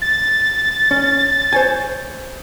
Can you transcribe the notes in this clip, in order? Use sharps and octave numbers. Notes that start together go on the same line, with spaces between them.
A6
C#4
C5 C#5 G#5